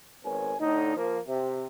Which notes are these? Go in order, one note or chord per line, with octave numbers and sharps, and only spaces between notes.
G#1 B3 A#4 C#5 G#5
A2 D3 D#4
F3 A#3
C3